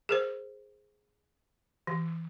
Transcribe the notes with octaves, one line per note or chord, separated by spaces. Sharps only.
G#4 A#4 C5
E3